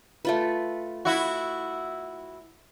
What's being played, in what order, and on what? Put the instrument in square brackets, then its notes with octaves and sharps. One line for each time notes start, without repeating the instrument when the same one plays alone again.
[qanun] A3 F4 B4
[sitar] E4 F#4